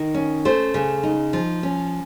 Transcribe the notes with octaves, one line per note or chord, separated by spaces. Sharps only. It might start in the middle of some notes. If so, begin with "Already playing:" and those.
Already playing: D#3
C#4
A3 C5
C#3
D#4
F3
C#4